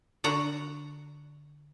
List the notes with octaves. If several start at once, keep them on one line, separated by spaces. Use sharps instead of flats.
D3 F#4 A#5